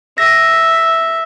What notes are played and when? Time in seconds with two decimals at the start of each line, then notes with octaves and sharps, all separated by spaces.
0.18 E5 A#6